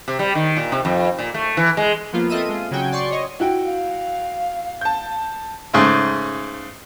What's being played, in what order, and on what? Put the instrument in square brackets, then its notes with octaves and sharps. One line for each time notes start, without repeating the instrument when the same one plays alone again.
[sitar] C3
G3
D#3
A#2
C3
F2
A#2
A3
E3
G#3
[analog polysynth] F3 A#3 B3 F4
C4 F4 A4 D#5 E5 D#7
G#3 F4
C#3 F#3 F#4 G5 G#5
D5 C6 C#6
C#5 D#5
[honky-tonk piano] E4 F#4 G5
[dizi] F5
[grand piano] A5 G6
[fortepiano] G#2 C#3 A3